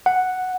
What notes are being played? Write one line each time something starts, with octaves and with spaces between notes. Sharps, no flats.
F#5